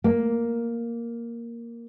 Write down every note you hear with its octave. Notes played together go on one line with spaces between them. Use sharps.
A#3